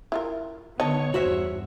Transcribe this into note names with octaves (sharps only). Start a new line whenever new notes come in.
E4 F4 A#4
D3 B3 D#4 C#5 D#5 A5
E2 G2 F#4 C5 E5